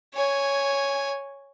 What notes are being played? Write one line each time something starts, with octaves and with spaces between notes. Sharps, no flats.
C#5 G#5